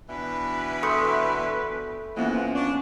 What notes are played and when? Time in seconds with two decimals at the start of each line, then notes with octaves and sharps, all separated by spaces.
0.09 B2 E3 D4 B4
0.83 A3 B5 C6 D#6
2.17 E2 E3 F3 A#3 B3 C#4 F#5
2.55 C#4 D4 C#6